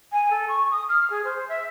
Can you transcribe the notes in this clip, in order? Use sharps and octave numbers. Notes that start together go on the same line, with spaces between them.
G#5
A4
C#6
D#6
F6
G#4
C5
E5